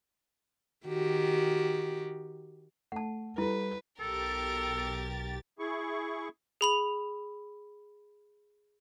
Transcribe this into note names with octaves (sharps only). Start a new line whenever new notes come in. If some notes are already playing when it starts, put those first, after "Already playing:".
D#3 F#4 G4
A3 F#5 A5
G3 E4 A4 B4
B1 G4 A4 A#4 A6
E4 G#4 C#6
G#4 B5 F7